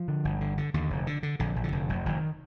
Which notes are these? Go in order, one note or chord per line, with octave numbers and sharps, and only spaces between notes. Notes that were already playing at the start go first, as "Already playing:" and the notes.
Already playing: F3
D3
G1
D3
D3
D#2 D3
F1
D3
D3
A#1 D3
A#1
D3
F1
F1
F1 D#3